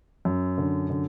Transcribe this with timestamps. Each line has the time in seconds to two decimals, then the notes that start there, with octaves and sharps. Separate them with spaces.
0.25 F#2
0.58 D3
0.90 D3